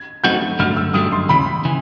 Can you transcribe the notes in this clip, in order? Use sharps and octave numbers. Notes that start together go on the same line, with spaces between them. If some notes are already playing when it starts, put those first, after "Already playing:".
Already playing: G#6
F#3 A3 C4 D#4 F#4 G6
G2 D3 F#3 A3 F6
E6
G2 D3 F#3 A3 D#6
C6
D#2 C#3 E3 B5
C#3 E3